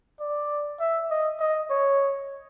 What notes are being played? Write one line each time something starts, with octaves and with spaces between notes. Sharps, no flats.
D5
E5
D#5
D#5
C#5